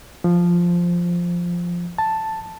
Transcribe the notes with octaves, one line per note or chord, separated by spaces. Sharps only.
F3
A5